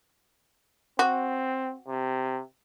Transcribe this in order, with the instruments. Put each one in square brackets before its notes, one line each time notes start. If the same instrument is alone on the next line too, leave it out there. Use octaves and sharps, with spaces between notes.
[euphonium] C4 [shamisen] F#4
[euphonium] C3